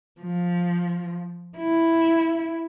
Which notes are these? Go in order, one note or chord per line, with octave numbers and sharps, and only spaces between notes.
F3
E4